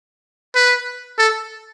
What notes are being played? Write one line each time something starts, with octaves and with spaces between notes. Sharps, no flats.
B4
A4